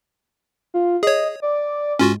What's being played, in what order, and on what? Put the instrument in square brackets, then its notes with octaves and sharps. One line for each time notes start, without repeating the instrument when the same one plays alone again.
[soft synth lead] F4
[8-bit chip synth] G#4 C#5 [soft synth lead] D#5
[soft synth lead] D5
[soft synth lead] G#2 [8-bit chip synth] C#4 F4 F#4